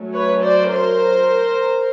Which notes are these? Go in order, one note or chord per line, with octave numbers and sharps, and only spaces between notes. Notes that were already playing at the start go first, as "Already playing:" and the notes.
Already playing: F#3 A3 C#4
B4 C#5
C5 D5
A#4 C5